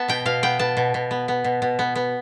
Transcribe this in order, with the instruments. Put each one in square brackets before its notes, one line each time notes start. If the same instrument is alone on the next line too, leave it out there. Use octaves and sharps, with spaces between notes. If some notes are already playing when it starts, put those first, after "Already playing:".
Already playing: [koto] B3 A5
B2 G5
B2 F5
B3 G5
B3 A5
B2
B2
B3
B3
B2
B2
B3
B3